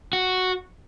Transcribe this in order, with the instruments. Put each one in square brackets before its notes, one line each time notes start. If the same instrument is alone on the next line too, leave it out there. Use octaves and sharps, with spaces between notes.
[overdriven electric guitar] F#4